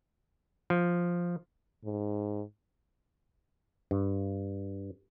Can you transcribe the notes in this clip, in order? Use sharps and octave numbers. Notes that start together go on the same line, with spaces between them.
F3
G#2
G2